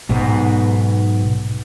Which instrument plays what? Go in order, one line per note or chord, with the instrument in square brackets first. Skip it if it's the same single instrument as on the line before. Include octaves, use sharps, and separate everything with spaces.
[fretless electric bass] B1 G#2 B2